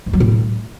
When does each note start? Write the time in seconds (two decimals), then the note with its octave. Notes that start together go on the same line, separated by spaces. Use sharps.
0.06 G#2
0.13 F#3
0.20 A2